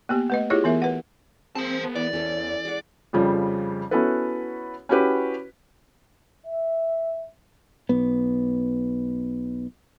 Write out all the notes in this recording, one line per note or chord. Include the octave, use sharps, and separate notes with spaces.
A#3 B3 G4
A3 B4 D#5
E4 F4 G4 G#4 C#5
E3 B3 A#4 E5
B4 F#5
G#3 A#3 C4 C5 A5
B3
E3 D5
E2 E3 C#4 A4
G#3 F#5
F2 C#3 F3 G3
B3 C#4 E4 F#4 A4 B4
C#4 E4 F#4 G4 B4
E5
B1 B3